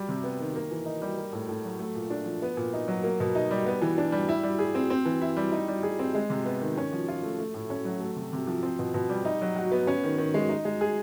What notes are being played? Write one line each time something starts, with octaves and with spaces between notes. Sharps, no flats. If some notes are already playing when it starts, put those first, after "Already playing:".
Already playing: G3
C3
B3
D#3
A#3
E3
D#4
G3
A#3
A2
A2
F#3
A3
A#2
D4
F3
B3
A#2
D#4
F#3
A#3
B2
D#4
G3
B3
E3
D4
G3
E4
G3
G#4
C4
C4
E3
E4
G3
D#4
G3
G#4
C4
G#3
C3
B3
D#3
C#4
F3
F4
A3
A3
A2
C#4
F#3
A3
C3
C3
F3
C4
B2
B2
G3
D#4
F#3
F#4
B3
C#4
D#3
D#3
G#3
D#4
G#3
G#4